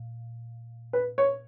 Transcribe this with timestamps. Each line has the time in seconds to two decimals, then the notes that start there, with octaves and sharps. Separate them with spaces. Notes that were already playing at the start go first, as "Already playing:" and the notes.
Already playing: A#2
0.93 B4
1.18 C#5